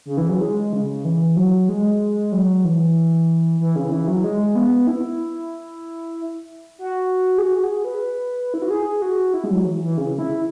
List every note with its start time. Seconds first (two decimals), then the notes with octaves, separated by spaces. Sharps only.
0.05 C#3
0.17 E3
0.29 F#3
0.41 G#3
0.73 C#3
1.05 E3
1.36 F#3
1.69 G#3
2.32 F#3
2.64 E3
3.60 E3
3.76 C#3
3.91 E3
4.08 F#3
4.24 G#3
4.55 B3
4.87 E4
6.79 F#4
7.38 G#4
7.42 F#4
7.63 G#4
7.84 B4
8.54 E4
8.62 F#4
8.70 G#4
9.02 F#4
9.34 E4
9.44 G#3
9.50 F#3
9.65 E3
9.82 E3
9.97 C#3
10.18 E4